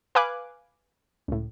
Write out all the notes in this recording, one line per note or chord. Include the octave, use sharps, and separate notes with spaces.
B4 F5 G#5 D6 F#6
C#2 A2